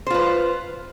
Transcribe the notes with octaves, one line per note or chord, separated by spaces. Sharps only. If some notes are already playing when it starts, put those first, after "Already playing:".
F4 B4 C5